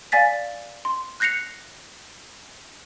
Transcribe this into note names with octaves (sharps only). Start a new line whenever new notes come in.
D5 F5 G#5 A6 B6
C6
F#6 G6 A#6 C7 C#7 F7